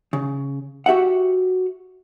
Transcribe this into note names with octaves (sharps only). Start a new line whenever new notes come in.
C#3
F#4 G4 E5 F#5